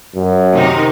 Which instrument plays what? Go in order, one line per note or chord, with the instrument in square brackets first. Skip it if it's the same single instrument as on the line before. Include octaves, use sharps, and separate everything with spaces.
[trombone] F#2
[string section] C3 D#3 D#4